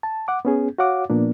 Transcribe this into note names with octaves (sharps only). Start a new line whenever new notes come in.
A5
F#5 D6
B3 C#4 G#4
F#4 C#5 F5 F#5 D6
A#2 F3 A#3 B3 D4